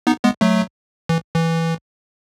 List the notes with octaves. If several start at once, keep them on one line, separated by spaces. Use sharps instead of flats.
B3 D#4
G#3 B3
F#3 A3
E3
E3